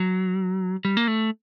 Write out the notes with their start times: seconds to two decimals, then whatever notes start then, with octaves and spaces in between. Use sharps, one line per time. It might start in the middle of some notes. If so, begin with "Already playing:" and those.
Already playing: F#3
0.85 G3
0.97 A#3
1.08 A3